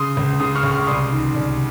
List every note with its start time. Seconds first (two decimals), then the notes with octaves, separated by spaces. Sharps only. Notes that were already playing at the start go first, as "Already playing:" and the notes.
Already playing: C#3 C6 D#6
0.17 C#2
0.40 C#3 C6 D#6
0.55 C#6 F6
0.63 C#2
0.71 C#6 F6
0.87 C2 C6 D#6
1.11 D#3
1.34 C2